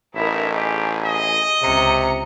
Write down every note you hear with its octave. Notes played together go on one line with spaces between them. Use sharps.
A1 D#4 E4 A#4 E5
G4 G#4
D#5
C#2 C3 A#5 C#7